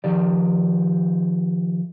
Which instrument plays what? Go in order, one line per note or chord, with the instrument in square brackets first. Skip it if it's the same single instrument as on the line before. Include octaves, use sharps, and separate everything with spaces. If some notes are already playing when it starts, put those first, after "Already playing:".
[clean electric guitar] D#3 F3 G4 D5